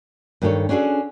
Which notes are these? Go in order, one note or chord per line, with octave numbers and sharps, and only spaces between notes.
G2 D#3 F#4 G4 A4 C#5
C#4 D4 F#4 G#4 A4